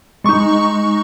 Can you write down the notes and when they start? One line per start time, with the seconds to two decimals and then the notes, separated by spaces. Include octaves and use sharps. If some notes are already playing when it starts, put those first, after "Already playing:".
0.24 G#3 D#4 C#6